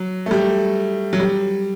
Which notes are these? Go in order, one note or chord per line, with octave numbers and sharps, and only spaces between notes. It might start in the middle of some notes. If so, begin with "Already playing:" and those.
Already playing: F#3
A3
G3
F#3
G3